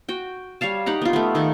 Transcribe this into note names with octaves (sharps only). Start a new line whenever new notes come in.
F#4 G5
G3 C#5 F5 A5
D#4 G4 F#5 A#5
B3 F4
A3 B3
D#3 A4